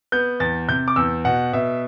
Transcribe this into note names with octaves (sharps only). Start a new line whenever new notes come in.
B3 G6
E2 A6
C3 G6
D6
E2 E6
B2 F#5
B2 E5